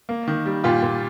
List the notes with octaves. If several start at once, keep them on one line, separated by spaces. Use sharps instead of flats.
A#3
D#3
G3
A#2 F4 G4
A#2